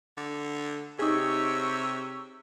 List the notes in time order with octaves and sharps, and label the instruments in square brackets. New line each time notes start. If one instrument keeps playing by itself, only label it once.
[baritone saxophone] D3
[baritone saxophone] C3 [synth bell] D#4 G#4 [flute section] G4 C#6 E6 [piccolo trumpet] C#5